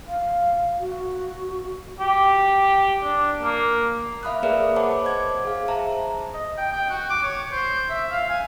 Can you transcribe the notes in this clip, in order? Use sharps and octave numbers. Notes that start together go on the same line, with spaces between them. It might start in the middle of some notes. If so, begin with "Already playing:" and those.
F5
F#4
G4
D4
A#3
E5 F5 B5 D#6 F#6
A#3 G#4 A#4 B4 D5 E5
C5 C#5 F#5 A5 B5 D6
C5 D#5 D6 G#6
G#4 F5
C5 E5 A5 A#5
D#5
G5
G5
F#4
D6
C#5
C5
E5
F5
G#5